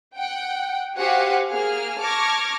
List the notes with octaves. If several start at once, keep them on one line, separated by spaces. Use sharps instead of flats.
F#5 G5
F#4 G4 C5 F5 F#5 G#5
A#3 G#4 F6
A5 C#6 D6 F6 G#6 A#6